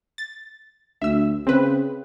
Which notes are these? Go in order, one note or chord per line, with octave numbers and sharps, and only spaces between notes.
A6
D2 E5 E6
C#3 C4 B4